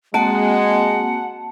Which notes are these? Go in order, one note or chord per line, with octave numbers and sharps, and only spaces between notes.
G#3 A#3 C4 F#4 F#5 A5